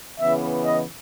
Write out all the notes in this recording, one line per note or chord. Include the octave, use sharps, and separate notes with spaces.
C#3 E3 B3 E5
D#5